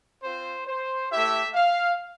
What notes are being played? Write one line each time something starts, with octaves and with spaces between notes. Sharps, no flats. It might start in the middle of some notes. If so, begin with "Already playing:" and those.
C4 F4 C5
C5
A3 E4 G4 E5
F5